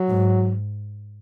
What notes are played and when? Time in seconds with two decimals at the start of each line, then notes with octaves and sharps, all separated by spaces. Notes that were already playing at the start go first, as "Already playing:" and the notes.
Already playing: F#3
0.09 G#2